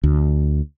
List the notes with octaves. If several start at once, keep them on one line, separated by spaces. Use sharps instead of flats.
D2